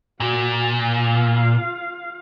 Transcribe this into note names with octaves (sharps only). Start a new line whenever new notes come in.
A#2 F#4
F4 F5